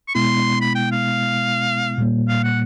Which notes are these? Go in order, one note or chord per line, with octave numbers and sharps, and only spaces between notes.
C#6
B2 G#3 B3 E4 C6
B5
G5
F5
A#2 G3 A#3
F5
F#5